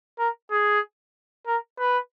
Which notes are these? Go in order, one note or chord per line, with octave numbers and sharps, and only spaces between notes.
A#4
G#4
A#4
B4